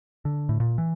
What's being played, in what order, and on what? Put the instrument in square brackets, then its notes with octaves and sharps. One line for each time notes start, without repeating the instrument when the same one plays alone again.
[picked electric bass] D3
A2
A#2
E3